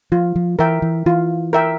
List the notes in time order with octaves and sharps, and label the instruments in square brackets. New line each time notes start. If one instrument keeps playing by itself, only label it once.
[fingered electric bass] F3 [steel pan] F4
[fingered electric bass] F3
[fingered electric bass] E3 [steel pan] A#4 E5 G5
[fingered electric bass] E3
[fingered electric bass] E3 [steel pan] F4
[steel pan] A#4 E5 G5